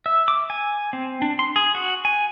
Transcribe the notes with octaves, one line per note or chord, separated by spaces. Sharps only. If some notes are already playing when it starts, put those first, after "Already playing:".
E5
D6
G#5
C4
D4
C6
G#4
F#4
G#5